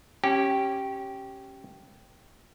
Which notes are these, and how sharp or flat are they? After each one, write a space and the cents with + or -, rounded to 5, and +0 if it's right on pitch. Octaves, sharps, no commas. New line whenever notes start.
C#4 -15 G4 -10